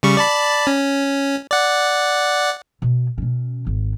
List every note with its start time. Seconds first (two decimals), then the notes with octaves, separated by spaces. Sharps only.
0.03 C#3 G3 C#6
0.17 D5 A5 B5
0.67 C#4
1.51 D5 F#5
2.82 B2
3.18 B2 C#4
3.67 G#1